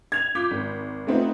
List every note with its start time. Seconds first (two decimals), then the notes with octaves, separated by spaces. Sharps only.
0.12 G#6 F7
0.35 F4 D6 G6 B6
0.51 G#1
1.07 A3 B3 C4 D#4 F4